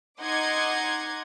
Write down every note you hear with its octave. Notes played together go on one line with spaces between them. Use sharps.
D#4 D#5 F#5 C6 D6 G#6